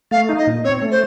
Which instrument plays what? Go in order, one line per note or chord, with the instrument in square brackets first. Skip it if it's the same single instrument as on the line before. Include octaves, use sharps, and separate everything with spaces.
[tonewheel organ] A3 [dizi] F5
[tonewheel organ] D#4
[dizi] D#5
[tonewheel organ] A#2
[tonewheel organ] C4 [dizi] C#5
[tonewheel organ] A3
[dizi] C5